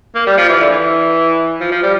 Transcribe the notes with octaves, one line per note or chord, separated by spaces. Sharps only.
A#3
G3
F3
E3
D3
E3
F3
F3
G3